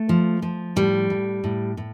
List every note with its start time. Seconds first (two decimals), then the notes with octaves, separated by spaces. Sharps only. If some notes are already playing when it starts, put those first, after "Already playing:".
Already playing: A3
0.09 F3
0.42 F3
0.76 A2 G3
1.10 A2
1.44 A2
1.77 A2